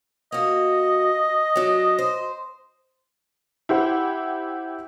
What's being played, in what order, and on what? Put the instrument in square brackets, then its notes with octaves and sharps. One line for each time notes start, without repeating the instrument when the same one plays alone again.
[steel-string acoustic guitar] A#3 F#4 [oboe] D#5
[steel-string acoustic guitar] F#3 D4
C5
[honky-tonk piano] E4 G4 C5 F#5